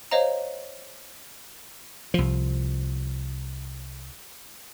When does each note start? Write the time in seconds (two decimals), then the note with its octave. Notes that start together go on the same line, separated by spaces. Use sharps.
0.11 C5 C#5 D#5 F5 A#5
2.14 C2 F3